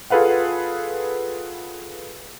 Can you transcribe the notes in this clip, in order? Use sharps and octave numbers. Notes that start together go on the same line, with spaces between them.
F4 G#4 A4 B4 F5 F#5